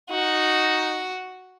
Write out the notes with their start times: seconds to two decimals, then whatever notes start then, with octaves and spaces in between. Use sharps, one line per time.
0.11 D#4 F#4